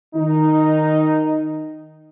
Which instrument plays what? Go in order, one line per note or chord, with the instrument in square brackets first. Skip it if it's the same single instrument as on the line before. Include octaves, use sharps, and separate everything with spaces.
[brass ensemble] D#3 D#4